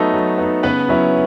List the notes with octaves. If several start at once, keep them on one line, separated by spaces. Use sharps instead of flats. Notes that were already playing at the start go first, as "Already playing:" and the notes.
Already playing: F#3 A3 B3 D#4 A4
F#3
B3 D#4
C#3 B3 B4
F#3 C#4 E4